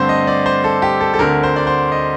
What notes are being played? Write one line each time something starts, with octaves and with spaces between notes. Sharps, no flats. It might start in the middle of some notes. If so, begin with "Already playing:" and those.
Already playing: G2 D3 A3 C4 C5
D#5
D5
C5
A4
G4
A4
A4
D2 D3 A3 C4 A#4
C5
D5
C5
D#5